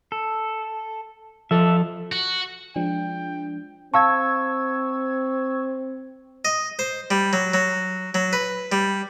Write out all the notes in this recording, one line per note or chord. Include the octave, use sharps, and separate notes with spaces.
A4
F3 A4 E5
F#4
F3 G#3 D4 G5
C4 F5 A5 C#6 E6 G#6
D#5
C5
G3
F#3
F#3
F#3
B4
G3